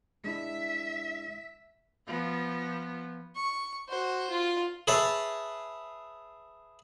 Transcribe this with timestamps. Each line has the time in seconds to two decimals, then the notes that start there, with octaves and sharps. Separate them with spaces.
0.24 G#3 D4 E4 E5
2.07 F3 B3
3.36 C#6
3.88 F#4 C5
4.30 F4
4.87 G#4 B4 C#5 E5 A5